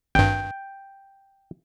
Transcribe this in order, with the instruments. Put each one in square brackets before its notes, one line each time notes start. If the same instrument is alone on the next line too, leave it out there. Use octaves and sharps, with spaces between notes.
[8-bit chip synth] G#1 G2 [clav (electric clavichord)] G5